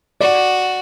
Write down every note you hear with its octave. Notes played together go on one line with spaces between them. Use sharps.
F#4 D5